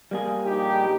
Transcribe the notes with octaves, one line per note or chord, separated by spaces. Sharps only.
G3 A#3 G#4
A#1 D#4 G4